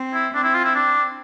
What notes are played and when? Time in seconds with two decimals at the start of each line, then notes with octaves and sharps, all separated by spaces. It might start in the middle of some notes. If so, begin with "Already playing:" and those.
Already playing: C4
0.14 E4
0.34 C4 D4
0.44 E4
0.54 F4
0.64 E4
0.75 D4